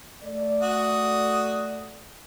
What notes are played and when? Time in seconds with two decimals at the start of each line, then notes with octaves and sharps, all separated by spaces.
0.23 A3 D5
0.62 F#4 D#6